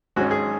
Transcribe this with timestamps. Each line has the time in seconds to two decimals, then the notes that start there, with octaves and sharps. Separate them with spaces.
0.16 G#1 G#2 G#3 C#4 F#4
0.31 G#4